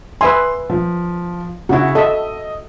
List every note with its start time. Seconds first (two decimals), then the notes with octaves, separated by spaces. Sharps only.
0.21 B4 E5 G#5 C6
0.70 F3
1.69 C#3 E4 F#4
1.95 A4 D#5 E5